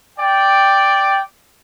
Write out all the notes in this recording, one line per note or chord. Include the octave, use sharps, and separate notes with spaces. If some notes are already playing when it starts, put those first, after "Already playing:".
D5 G5